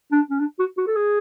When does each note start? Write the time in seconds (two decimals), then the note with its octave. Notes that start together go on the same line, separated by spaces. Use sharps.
0.12 D4
0.30 C#4
0.40 D4
0.59 F#4
0.78 F#4
0.87 A4
0.96 G#4